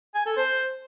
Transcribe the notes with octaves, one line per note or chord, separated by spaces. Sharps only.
G#5
A4
C5